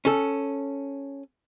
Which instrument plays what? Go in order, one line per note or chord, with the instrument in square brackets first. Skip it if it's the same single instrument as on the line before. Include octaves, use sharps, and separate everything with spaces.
[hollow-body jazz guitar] C#4 A4